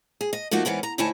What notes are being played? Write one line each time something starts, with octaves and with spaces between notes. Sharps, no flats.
G#4
D#5
F3 A3 A#3 D#4 F#4
G#2 E3 B3 C#4 A#4
A#5
D2 D#4 E4 C#5 G#5 A5